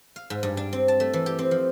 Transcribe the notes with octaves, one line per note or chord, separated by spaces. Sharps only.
F5
G#2
G2
D4
C4
A5
A3
E3
G4
C4
F3